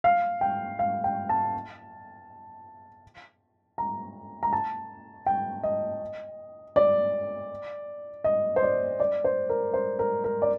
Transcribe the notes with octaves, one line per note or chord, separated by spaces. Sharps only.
F5
G5
F5
G5
A5
A#5
A#5
A5
G5
D#5
D5
D#5
C5
D5
D5
C5
A#4
C5
A#4
A#4
D5